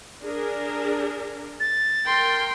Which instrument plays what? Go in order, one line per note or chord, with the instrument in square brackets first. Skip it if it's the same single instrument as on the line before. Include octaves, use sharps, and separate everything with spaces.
[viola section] D4 G#4 A#4
[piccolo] A6
[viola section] A#4 [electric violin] G5 C6